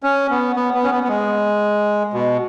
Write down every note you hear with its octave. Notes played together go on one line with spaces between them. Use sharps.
C#4
B3
B3
B3
C#4
B3
B3
G#3
B2